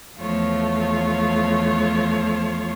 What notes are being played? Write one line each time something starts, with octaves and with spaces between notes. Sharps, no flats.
E2 F3 A3 F4 C#5